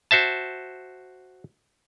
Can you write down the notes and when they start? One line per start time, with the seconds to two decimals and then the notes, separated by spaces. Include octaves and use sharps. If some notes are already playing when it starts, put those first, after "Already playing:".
0.11 F#4 C5 E5 A5